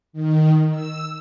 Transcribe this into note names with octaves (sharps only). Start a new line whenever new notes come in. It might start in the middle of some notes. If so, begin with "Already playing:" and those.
D#3
E6